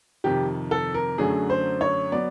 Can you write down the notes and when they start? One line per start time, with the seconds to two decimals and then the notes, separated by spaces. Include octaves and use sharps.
0.24 F2 C3 D#3 G4
0.71 A4
0.94 A#4
1.18 F#2 D3 F#3 A3 G#4
1.50 C5
1.81 C#5
2.12 F#3 B3 D5